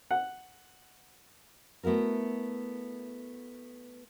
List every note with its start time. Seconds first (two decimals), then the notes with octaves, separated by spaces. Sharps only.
0.11 F#5
1.83 A3 B3 E4 F#4 A#4